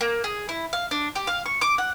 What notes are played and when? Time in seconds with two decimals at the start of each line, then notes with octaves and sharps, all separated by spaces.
0.01 A#3
0.24 G#4
0.49 E4
0.73 F5
0.91 D4
1.16 G4
1.27 F5
1.46 C#6
1.61 D6
1.78 F#5